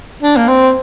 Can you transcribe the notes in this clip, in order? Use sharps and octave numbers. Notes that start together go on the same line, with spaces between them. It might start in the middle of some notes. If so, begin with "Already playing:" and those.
D4
A#3
C4